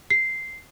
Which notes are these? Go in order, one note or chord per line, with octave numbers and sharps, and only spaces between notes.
C7